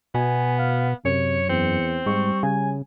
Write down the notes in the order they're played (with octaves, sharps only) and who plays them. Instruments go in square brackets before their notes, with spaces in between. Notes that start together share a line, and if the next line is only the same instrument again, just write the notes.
[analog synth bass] B2 [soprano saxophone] B3 [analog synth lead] G#5
[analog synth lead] F5
[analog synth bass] F#2 [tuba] C3 [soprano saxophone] C#5 [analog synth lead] C#7
[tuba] E2 [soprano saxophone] C4
[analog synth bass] G#2 [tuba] G3 [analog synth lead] C#6
[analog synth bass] C#3 [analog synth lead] G#5